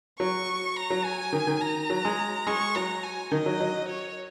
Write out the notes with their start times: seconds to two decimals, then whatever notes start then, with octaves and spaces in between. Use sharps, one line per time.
0.19 F#3 C#6
0.76 A#5
0.90 F#3
1.05 G#5
1.32 D#3
1.47 D#3
1.61 A#5
1.90 F#3
2.05 G#3
2.47 G#3 C#6
2.75 F#3 A#5
3.03 G#5
3.32 D#3 D#5
3.46 F#3
3.60 F#3
3.89 C#5